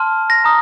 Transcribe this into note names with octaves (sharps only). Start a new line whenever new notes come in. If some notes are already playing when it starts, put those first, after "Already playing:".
Already playing: A5 C6 F6
A#6
A#5 D#6